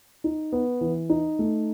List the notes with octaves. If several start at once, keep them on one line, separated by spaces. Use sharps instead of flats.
D#4
B3
E3
D#4
A3